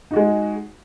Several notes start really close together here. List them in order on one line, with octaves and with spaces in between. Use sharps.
D#4 F#4 G#3